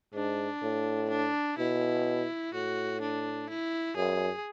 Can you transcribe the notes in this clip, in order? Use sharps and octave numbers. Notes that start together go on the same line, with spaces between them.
G#2 D4
A2
D4
B2 E4
A2 F#4
D4
E4
F#2 G#4